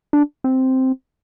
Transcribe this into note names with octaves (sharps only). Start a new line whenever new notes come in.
D4
C4